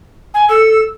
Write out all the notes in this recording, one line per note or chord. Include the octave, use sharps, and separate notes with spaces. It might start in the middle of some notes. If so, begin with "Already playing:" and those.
G#5
A4 E6